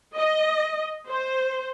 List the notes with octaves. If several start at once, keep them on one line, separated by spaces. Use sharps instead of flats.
D#5
C5